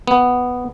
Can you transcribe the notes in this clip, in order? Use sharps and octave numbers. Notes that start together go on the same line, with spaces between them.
B3